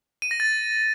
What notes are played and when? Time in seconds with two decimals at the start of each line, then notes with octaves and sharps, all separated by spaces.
0.22 D#7
0.31 A#6
0.40 A6